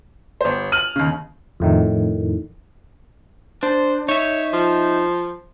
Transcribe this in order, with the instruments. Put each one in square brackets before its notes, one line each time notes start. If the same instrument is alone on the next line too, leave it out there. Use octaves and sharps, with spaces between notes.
[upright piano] G1 C5
F6 D#7 F#7
[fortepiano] D#2 C#3
[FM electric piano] F2 A2 D#3
[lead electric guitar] D4 [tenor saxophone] C5
[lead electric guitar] D#4 E5 [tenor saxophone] C#5
[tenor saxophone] F3